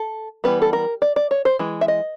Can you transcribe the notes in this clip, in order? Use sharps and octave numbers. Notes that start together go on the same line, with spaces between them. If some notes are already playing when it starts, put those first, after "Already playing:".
Already playing: A4
E3 G3 B3 B4
A4
A#4
D5
D5
C#5
C5
E3 G#3
E5
D#5